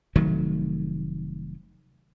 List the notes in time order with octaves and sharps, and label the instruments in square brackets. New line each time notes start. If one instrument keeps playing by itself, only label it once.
[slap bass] F1 D#3 F#3 A3